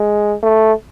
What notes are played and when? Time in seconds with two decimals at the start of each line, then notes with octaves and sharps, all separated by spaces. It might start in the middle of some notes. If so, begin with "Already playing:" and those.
Already playing: G#3
0.43 A3